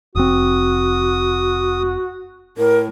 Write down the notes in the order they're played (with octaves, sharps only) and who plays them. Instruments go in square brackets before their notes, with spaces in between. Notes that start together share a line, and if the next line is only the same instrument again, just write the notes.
[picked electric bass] F1 C4 [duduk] F#4 [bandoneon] D#6
[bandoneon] A2 [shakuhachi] A#4